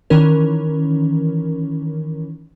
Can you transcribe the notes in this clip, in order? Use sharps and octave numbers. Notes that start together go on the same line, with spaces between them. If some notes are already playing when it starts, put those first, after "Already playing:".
D#3 E3 C#4 A#4